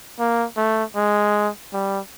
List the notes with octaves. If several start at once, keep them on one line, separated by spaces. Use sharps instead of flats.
A#3
A3
G#3
G3